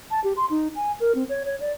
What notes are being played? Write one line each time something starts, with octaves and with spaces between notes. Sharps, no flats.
A5
G4
C6
D#4
G#5
A#4
C4
C#5
C#5
D5